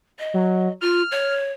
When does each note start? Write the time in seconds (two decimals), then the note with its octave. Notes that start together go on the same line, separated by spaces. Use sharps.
0.19 D#5
0.34 F#3
0.81 F4 F6
1.12 C#5